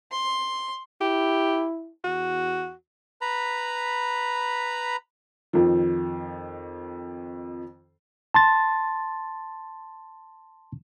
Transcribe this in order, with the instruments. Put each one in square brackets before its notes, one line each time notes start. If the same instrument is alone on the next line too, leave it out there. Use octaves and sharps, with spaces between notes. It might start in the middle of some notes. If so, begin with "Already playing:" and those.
[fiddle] C6
[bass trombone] E4 [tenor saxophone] G4
[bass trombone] E2 [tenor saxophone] F#4
[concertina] B4 A#5 B5
[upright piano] F2 D#3 F3
[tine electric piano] A5 C6 A6